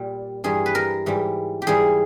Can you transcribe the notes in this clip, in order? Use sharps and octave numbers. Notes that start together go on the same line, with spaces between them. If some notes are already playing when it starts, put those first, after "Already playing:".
Already playing: A#2 G3
G2 E3 G3 G#4
B4
A#4
G#2 E3 G3
G4
G#2 E3 G3 G#4